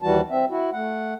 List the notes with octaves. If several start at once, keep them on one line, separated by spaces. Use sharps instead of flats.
D#2 E3 G3 F#4 A5
C4 E5
E4 F#4
A3 F#5